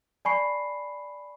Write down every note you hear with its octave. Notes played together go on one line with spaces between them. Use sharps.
D5 G#5 A5 B5 C#6 C7